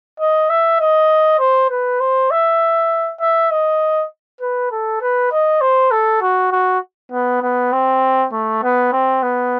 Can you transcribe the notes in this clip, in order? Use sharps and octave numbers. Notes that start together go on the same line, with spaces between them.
D#5
E5
D#5
C5
B4
C5
E5
E5
D#5
B4
A4
B4
D#5
C5
A4
F#4
F#4
B3
B3
C4
A3
B3
C4
B3